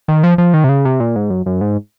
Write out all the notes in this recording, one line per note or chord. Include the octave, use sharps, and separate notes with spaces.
D#3
F3
F3
D#3
C3
C#3
C3
A#2
G#2
F#2
F#2
G#2